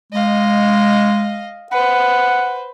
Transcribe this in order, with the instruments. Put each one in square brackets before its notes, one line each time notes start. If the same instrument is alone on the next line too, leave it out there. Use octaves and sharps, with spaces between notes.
[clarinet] G#3 [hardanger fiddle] D#5 F5
[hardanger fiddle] B4 C5 [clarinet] F#5